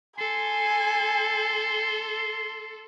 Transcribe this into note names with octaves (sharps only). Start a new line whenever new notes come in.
A4 G#5 C6